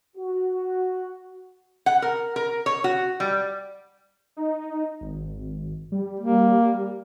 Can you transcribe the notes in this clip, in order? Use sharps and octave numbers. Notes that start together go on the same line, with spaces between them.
F#4
F#5
A#4
A#4
C#5
F#4
G3
D#4
G#1
G3
A#3